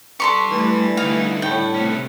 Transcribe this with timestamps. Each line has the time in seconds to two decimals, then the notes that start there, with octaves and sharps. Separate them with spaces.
0.20 D4 G4 A4 C6 C#6
0.51 E3 G3 A3
0.97 D3 A3 D#4 F5 F#5
1.42 A2 G5
1.75 C3 A3 B3 C#4